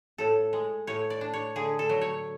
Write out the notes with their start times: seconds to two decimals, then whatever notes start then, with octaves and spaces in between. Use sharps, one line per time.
0.18 A2 A4
0.53 G#3
0.87 A2 C#5
1.10 D5
1.21 D4
1.33 C#5
1.56 D3 G#4
1.79 A4
1.89 F#3
2.01 C#5